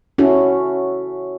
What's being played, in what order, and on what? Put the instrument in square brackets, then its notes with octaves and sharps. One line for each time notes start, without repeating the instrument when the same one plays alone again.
[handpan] C#4 E4 F#4 A4